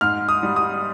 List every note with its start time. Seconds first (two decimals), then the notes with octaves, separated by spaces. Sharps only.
0.01 G#2 F6
0.29 D#6
0.43 G3
0.56 D#6